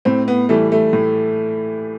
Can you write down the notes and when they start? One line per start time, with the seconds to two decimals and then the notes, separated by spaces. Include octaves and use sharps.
0.05 A2 C4
0.28 B3
0.49 E3 G3 A3
0.72 A3
0.93 A2